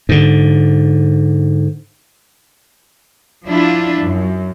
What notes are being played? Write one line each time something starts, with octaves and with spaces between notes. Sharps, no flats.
G#2 D3
F3 D4 E4 F4
F#2